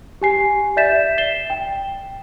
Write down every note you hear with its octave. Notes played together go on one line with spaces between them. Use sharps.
G4 G#5 C7
D5 E5 G6 A6 B6 E7
A6 C7 E7 G7
G5